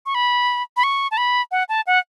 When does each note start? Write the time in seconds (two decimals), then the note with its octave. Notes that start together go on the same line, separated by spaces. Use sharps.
0.06 C#6
0.15 B5
0.77 B5
0.83 C#6
1.11 A5
1.17 B5
1.51 F#5
1.69 A5
1.87 F#5